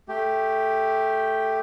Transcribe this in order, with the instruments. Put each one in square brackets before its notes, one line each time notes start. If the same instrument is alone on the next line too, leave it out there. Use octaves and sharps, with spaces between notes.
[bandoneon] A3 G4